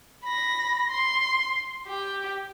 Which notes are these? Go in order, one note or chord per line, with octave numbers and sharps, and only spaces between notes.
B5 A#6
C6
G4 G5